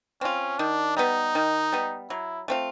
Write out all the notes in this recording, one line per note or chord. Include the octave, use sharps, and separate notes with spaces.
C4 C#4 F4
D#3 D4
G3 B3 D#4
D#3
G3 B3
F#3 E4
A3 C4 F4